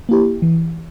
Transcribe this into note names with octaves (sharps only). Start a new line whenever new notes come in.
A#3 E4 G4
E3